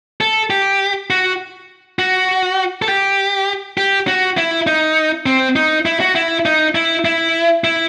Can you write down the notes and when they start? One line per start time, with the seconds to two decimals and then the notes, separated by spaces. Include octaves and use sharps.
0.21 A4
0.50 G4
1.10 F#4
1.99 F#4
2.82 A4
2.89 G4
3.78 G4
4.08 F#4
4.37 E4
4.67 D#4
5.26 C4
5.56 D#4
5.86 E4
6.00 F#4
6.15 E4
6.45 D#4
6.75 E4
7.05 E4
7.64 E4